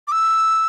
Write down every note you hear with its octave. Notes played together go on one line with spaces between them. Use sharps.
D6
E6